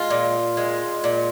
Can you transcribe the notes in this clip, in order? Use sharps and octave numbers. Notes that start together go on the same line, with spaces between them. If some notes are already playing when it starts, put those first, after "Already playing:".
Already playing: G#3 F4
A#2
G#3
A#2